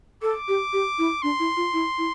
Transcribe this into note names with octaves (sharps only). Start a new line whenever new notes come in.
A4 D6
G4
G4
E4
D4 C6
E4
F4
E4
E4